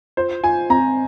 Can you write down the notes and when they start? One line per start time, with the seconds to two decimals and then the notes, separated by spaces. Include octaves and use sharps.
0.17 F4 C5
0.43 F4 G#5
0.70 C4 A#5